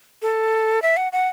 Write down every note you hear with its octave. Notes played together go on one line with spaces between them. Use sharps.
A4
E5
F#5
F#5